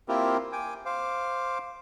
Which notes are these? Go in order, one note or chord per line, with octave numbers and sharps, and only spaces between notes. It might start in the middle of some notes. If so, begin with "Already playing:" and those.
A#3 C4 E4 F4 G4 A#4
G5 G#5 D6
C5 F5 D6